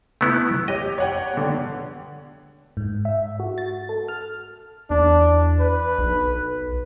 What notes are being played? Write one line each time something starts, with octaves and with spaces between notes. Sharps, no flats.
A3 B3 E4 G#6
G4 C#5 D#5
C#5 F#5 G5
D3 B3
G#2
E5
F#4
A6
A4
F6
E2 D4
B4
B1